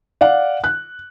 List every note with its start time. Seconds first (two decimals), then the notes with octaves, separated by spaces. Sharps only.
0.21 D5 F5 F#5
0.64 F#6